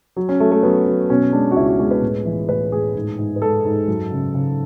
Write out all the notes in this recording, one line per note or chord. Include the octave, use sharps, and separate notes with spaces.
F#3
C#4
F#3 A3
A3
F#3 B3
F#3
B2 C#4
G#3 D4
F#4
C#2 E4
F#4
G#3 C#5
B4
A2
E3
A2 B4
A2 G#4
G#2
G#2
B4
G#3 A4
G#2
F#2
C#3
C#3